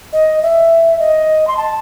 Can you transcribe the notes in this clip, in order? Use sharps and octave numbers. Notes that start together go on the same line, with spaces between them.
D#5
E5
D#5
C6
A5